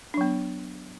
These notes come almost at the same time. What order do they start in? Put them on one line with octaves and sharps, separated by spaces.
D4 F#3 B3